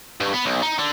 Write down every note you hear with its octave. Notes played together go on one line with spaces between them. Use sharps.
G2
B3
B1
D#4
D3